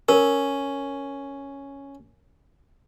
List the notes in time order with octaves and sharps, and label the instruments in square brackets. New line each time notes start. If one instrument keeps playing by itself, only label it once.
[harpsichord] C#4 [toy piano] A#4